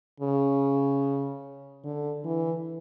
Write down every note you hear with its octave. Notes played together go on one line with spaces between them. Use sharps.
C#3
D3
E3